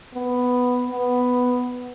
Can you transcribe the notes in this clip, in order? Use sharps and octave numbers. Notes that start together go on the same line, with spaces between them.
B3
B3